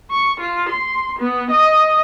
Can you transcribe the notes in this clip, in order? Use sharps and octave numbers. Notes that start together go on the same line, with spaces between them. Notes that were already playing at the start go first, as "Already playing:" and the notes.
C#6
F4
C6
B3
D#5